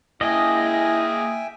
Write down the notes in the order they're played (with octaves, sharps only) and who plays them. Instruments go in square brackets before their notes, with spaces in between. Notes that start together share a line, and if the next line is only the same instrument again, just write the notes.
[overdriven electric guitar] A#3 G#4 [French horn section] E4 [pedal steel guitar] D#5 [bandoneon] E5 G5 G#5